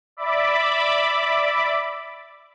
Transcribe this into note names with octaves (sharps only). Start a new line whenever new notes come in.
D5 E5 B5 D6